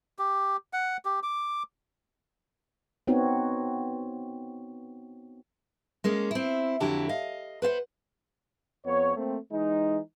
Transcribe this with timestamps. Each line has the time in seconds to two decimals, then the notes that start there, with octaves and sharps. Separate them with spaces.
0.19 G4
0.73 F#5
1.05 G4
1.23 D6
3.07 B3 C4 D#4 F#4 C#5
6.04 G#3 A#3 C#4
6.31 C4 E4
6.80 F2 D3 F#3 E4 G4 A4
7.09 D#5 F5
7.62 B4 C5 F5 F#5
8.86 F2 B3 C#5
9.17 A3 A#3 C4
9.52 E3 G#3 D#4